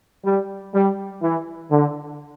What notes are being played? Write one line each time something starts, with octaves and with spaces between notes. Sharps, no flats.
G3
G3
E3
D3